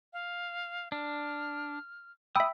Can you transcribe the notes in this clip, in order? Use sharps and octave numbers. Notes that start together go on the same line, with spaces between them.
F5
D4 F6
E5 G5 B5 D#6 E6